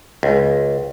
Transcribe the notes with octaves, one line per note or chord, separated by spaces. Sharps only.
C#2